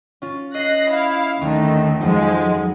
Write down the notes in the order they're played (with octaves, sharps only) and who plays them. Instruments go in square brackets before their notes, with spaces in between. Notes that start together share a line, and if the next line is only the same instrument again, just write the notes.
[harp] C#4 F4
[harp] D#5 [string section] F#6 A#6 C7
[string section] E4 F5
[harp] D#2 [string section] D3 D#3 A3
[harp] F2 F#3 D#4 [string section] F3 G#3